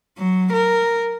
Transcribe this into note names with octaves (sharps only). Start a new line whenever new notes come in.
F#3
A#4